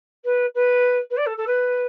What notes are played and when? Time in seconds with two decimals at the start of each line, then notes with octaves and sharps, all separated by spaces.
0.24 B4
0.55 B4
1.10 B4
1.17 D5
1.26 A4
1.37 A4
1.47 B4